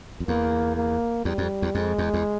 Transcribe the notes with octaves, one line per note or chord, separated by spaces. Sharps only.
F2
E2 A#3
A#3
E2 G3
F2
E2
F2 G#3
E2
E2